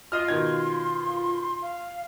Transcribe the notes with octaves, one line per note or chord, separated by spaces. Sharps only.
F4 D#5 C6 F6
B2 D#3 G#6
F5